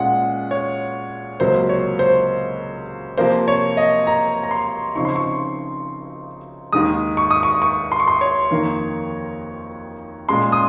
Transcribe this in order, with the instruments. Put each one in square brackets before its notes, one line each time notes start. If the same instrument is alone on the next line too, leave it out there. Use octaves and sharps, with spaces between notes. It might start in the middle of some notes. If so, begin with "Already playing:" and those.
Already playing: [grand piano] A#2 G#3 C#4 F4 F#5
C#5
C#2 C3 F#3 A#3 C5
C#5
C5
C3 F3 A#3 C5
C#5
D#5
A#5
A#5
C6
C#3 F3 C4 D#4 C#6
C6
C#6
D#2 D#3 G#3 D#6
C#6
D#6
C#6
C#6
C6
C#6
C6
C#5
F2 D#3 A#3
A#2 G#3 C#4 C6
D#6